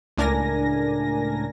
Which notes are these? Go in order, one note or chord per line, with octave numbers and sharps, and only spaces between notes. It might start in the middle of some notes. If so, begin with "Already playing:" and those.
C#2 A2 D4 A#4 G#5 A#6